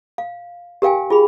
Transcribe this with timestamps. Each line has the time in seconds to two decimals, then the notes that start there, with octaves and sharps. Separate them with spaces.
0.18 F5
0.82 G4 A#4 F5 G5 G#5
1.10 F4 G#4 B5